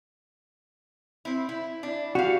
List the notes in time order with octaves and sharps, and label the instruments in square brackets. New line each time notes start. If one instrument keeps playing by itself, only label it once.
[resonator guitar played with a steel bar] C4 E4
E4
D4 E4
[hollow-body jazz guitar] F#4 [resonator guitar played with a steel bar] G4 F5